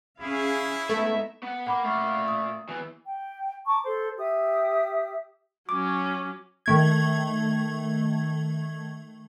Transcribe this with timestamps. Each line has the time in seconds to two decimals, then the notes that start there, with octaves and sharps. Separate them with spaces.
0.20 C#4 E4 G#4 F5
0.89 G#3 A3 B3 D#4 E5
1.43 B3 F#5
1.66 A#3 F#5 B5 D6
1.84 A#2 A3 F5
2.28 D#6
2.69 E3 B3
3.06 G5
3.65 A5 A#5 C#6 D6
3.84 A4 C5 C6
4.17 G4 E5 D#6
5.69 F#3 C#4 D6
6.66 D#3 A3 G#6